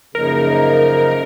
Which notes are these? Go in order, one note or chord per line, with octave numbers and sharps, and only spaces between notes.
F#2 C#3 F3 A#3 D#4 A#4